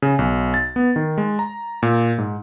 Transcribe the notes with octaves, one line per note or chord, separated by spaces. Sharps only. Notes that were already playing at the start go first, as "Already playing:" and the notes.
C#3
B1
A6
B3
D#3
G#3
A#5
A#2
G#2